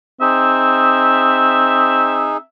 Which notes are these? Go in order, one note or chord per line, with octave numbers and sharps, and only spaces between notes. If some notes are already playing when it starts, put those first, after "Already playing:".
C4 D#4 G#4 E5